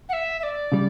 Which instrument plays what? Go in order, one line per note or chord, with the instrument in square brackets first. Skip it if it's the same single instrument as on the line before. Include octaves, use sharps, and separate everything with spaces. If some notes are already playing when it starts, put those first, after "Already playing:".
[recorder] F#5
E5
E5
D5
[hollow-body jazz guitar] C#3 G3